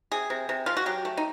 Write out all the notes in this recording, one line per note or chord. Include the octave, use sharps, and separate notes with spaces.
C3 G#4
C3
C3
F3 F4
F#4
F#3 G4
A3
D#4